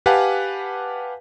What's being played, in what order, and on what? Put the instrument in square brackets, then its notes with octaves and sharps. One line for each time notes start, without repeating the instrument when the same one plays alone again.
[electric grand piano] G4 B4 F5 F#5 G#5 A5